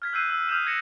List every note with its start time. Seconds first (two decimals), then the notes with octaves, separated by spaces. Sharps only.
0.02 F6 G#6 B6
0.13 E6 F#6 G6 C7 D#7
0.29 E6
0.49 D#6 F6 G6 E7
0.66 G#6 A#6 C#7 E7